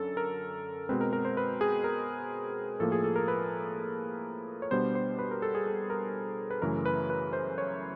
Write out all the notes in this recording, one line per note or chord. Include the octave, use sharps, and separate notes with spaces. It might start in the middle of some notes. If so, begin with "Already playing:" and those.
Already playing: F#2 D3 C#4 A4
A#4
B2 G#3 C4 B4
A#4
A#4
C5
B4
G#4
A#4
A2 F3 A#3 A4
G#4
A4
A#4
B4
C#5
B2 G3 B3 D4 C5
C5
B4
A#4
A4
G#4
A4
A#4
B4
F#2 C#3 E3 A3 A#4
B4
B4
C5
C#5